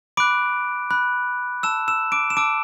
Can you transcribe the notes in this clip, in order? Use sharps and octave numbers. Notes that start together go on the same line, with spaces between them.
B5 D6 F#6 D7
B5 F#6
A5 E6 E7
E6 E7
D6 D7
E7
A5 D6 E6 D7